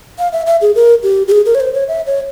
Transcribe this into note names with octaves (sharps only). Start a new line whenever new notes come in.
F5
E5
E5
G#4
A#4
G4
G4
G#4
A#4
C#5
C5
C#5
E5
C#5